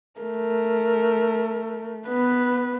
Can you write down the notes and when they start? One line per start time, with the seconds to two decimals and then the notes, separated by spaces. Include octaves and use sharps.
0.22 A3 A#4
2.07 B3 B4